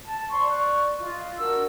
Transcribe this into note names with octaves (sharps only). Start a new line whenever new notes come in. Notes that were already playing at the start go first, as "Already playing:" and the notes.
A5
C5 D5 C6 C#6
D5 C#6 F#6
F4 D#5
D4 F#4 A#4 E6